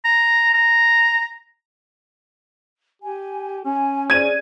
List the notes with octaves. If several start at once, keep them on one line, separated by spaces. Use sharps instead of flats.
A#5
A#5
G4 G#5
C#4 G#5
G#4 C5 D5 G#6 D#7